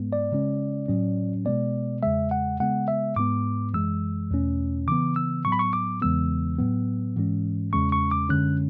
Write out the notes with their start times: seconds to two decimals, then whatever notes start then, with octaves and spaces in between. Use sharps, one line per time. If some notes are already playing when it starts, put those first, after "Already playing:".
Already playing: G#2 G#3 B3
0.13 D5
0.32 C#3 G#3 C#4
0.88 A2 F#3 C#4
1.45 B2 G#3 B3 D5
2.03 E2 C#3 G#3 E5
2.31 F#5
2.60 C#3 G#3 B3 F#5
2.88 E5
3.16 G#2 G#3 B3 D6
3.74 F#2 E3 G#3 E6
4.30 E2 B2 A3 C#4
4.88 C#3 E3 B3 D6
5.16 E6
5.45 A2 F#3 B3 C#6
5.52 B5
5.59 C#6
5.73 D6
6.02 E2 C#3 E3 G#3 B3 E6
6.58 A2 F#3 B3
7.16 G#2 E3 G#3 C#4
7.73 E2 C#3 G#3 C#4 C#6
7.92 C#6
8.11 D6
8.29 F#2 D3 G#3 C#4 F#6